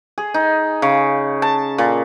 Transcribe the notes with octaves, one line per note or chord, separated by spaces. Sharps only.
G#4
D#4
C#3
A5
A#2